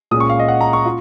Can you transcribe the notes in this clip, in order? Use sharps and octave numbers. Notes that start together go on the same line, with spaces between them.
A#2 G#3 C#4 D#6
C#6
F5
D#5
F#5
A#5
C#6
F4